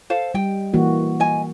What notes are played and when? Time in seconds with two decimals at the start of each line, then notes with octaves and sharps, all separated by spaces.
0.10 A4 C5 F5
0.34 G3 D#5 G5
0.74 E3 A#3 F#4
1.20 D#5 G#5